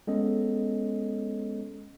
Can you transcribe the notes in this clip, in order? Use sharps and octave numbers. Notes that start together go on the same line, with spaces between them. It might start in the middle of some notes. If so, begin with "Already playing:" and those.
G#3 B3 C#4 A4 D#5